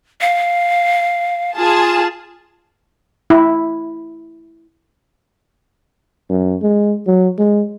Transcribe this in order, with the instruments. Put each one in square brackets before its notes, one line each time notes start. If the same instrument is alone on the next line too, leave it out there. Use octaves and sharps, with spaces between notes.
[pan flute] F5
[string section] F4 G#4 A5
[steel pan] E4
[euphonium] F#2
G#3
F#3
G#3